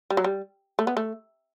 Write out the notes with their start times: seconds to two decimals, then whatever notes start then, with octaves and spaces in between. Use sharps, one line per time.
0.10 G3
0.17 F#3
0.24 G3
0.79 A3
0.87 B3
0.97 A3